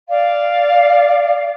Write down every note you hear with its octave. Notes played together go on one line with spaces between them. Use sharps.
D5 F5